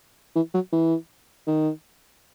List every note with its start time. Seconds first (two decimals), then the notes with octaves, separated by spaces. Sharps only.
0.35 E3
0.54 F#3
0.72 E3
1.47 D#3